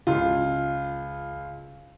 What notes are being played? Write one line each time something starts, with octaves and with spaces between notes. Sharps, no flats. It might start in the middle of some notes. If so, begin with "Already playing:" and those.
C#2 F4